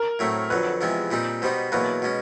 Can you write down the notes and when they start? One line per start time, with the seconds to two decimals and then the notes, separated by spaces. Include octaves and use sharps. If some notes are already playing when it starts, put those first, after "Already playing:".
Already playing: A#4
0.19 A2 F#3 A3 C4
0.50 F2 D3 F#3 B4
0.81 E2 C3 F3 G#3 C4
1.11 A#2 G3 C4 D#4
1.42 B2 G3 B3 D#4 C5
1.72 E2 B2 F#3 A#3 B4
2.02 B2 G#3 C#4